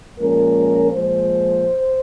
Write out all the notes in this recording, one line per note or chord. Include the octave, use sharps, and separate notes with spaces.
A#2 F3 G#3 C#4 A#4
A#2 F3 G#3 C5